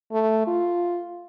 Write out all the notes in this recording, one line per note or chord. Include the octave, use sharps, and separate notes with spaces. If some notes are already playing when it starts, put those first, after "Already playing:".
A3
F4